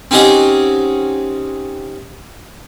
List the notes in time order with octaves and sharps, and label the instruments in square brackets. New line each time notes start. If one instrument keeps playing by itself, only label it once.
[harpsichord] C4 C#4 D#4 G4 G#4 F#5